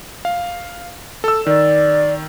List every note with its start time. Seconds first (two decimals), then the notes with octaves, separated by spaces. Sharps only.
0.25 F5
1.24 A4 E6
1.46 D#3 D5